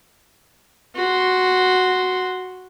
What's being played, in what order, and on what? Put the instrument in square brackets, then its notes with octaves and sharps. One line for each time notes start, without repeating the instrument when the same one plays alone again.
[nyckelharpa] F#4 C6